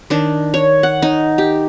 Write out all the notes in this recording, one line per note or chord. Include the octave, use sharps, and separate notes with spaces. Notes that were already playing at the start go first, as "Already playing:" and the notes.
D#3 D4
C#5
F#5
D#4
G4